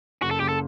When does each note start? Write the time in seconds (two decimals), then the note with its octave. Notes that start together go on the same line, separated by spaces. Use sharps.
0.22 F#1 F#4
0.31 A4
0.40 F#1 G4
0.49 A4